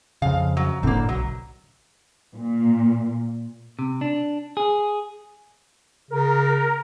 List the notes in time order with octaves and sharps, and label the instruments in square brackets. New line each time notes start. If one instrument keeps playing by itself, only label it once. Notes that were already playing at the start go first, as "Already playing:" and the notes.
[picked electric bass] F2 C#3 [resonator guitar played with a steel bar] F5
[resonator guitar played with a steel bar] F#3
[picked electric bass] F#1 A2 D3 [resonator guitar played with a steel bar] A#3 C4
[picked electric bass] B1 [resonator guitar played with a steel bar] F#3
[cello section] A#2
[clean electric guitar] C3
D4
G#4
[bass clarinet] C#3 [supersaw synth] A#4